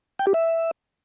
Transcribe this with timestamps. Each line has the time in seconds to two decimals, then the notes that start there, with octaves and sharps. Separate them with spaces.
0.19 G5
0.27 G4
0.34 E5